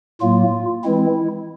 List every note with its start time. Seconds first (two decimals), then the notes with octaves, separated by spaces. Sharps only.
0.21 A2 F#3 A#3 F4
0.83 E3 G#3 C4 E4